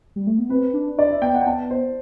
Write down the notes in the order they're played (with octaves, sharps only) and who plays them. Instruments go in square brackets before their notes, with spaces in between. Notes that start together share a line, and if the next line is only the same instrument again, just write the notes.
[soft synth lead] G3
A3
B3
[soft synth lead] C4 [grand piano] B4
[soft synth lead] D4
[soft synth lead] D4 [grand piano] D5
[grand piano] E5
[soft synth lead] B3 [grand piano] G5
[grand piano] F#5
G5
[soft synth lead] B3 [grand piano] A5
[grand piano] C5